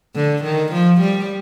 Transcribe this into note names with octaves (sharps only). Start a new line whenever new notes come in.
D3
D#3
F3
G3